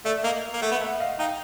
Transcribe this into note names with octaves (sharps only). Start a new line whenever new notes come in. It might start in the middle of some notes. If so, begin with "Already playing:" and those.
A3 D5 E5
A#3 D#5 F5
A#3
A3 E5 F#5
B3
E5 F#5
D#5 F5
D#4 F5 G5